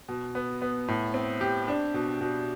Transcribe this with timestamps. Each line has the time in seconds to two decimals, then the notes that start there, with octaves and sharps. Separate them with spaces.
0.08 B2
0.35 B3
0.62 B3
0.88 A2
1.14 C4
1.41 G4
1.68 D4
1.94 B2
2.21 B2